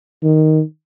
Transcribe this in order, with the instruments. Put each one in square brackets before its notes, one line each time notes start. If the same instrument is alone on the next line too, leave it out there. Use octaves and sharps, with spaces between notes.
[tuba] D#3